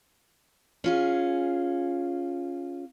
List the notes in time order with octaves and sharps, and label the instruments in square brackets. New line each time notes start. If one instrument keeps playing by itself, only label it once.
[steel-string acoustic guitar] C#4 F4 G#4